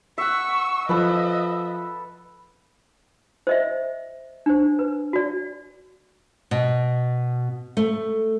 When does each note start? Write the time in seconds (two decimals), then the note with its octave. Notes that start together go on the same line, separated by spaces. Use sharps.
0.18 E5 F#5 C#6 E6
0.89 F3 A4 B4 D#5 E5
3.47 C5 D#5 E5
4.46 D4 C5
4.79 B4
5.13 F#4 D5
6.51 B2
7.77 A3